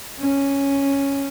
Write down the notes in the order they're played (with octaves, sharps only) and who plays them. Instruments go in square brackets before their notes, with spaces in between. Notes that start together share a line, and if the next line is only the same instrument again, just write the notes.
[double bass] C#4